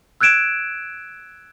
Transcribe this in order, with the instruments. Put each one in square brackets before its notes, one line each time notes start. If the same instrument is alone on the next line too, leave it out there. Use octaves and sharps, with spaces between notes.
[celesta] E6 F#6 G#6 D7 E7